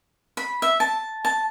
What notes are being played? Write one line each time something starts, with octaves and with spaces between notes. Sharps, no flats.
B5
E5
A5
A5